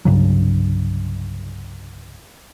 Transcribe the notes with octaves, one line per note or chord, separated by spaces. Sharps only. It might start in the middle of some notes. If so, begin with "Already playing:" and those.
C2 G2 C#3 F#3